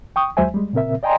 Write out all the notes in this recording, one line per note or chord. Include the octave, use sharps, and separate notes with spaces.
G5 C#6 D#6
D#2 F#3 G#3 C5 E5 G#5
G3 G#3
A#2 C#3 C4 A#4 E5
D5 D#5 G5 G#5 A#5 C6